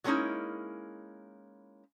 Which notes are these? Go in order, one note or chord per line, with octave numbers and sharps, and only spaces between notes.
F#3 G#3 A#3 C#4 D#4 E4